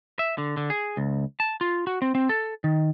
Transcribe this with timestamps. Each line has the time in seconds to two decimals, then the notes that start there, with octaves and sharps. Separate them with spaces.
0.19 E5
0.38 D3
0.57 D3
0.70 G#4
0.97 C#2
1.40 A5
1.61 F4
1.87 F#4
2.02 C4
2.15 C4
2.29 A4
2.64 D#3